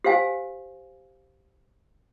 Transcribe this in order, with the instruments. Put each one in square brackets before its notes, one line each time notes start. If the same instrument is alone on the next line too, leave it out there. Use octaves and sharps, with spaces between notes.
[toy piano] G4 C5 F5 G#5